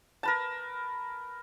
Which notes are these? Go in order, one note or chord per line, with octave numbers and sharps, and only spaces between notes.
A#4 B4 A5